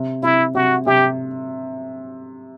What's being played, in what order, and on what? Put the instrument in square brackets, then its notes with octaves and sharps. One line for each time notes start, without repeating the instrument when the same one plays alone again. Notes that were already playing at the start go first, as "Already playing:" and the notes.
Already playing: [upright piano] C3
[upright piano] C3 [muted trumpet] E4
[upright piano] C3 [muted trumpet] F#4
[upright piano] C3 [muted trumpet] G4